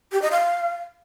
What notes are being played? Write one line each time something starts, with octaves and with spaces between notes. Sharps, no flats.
G4
D#5
F5